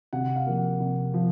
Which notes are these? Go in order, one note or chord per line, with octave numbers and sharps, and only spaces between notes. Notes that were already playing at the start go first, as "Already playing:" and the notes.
C3 F#5
F5
F3 A#3
F#5
C3
F3